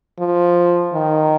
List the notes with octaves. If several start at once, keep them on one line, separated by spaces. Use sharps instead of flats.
F3
D#3